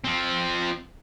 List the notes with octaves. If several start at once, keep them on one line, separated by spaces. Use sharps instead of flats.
F3 C4